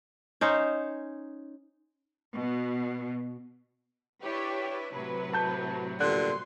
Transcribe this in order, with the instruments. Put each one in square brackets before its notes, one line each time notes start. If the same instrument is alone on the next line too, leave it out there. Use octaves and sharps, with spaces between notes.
[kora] C#4 D#4 C5 C#5
[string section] B2
[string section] D4 E4 B4 [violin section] G4 C#5
[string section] A2 C3 F#3 [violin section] B4
[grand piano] A5 G6
[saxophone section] G2 A#2 D3 [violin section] C6 [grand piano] F#6